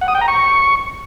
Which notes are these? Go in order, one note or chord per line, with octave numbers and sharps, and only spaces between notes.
F#5
D#6
G5
A#5
C#6